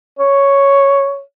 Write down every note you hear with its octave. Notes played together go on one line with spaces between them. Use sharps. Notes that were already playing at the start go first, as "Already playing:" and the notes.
C#5